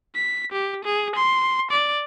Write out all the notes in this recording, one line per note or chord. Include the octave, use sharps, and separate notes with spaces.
B6
G4
G#4
C6
D5